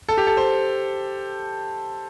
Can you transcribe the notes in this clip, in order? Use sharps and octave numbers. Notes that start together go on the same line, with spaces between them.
A4
G4
A4
C5